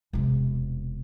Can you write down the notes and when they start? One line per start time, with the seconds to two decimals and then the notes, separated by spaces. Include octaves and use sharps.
0.13 E1 C3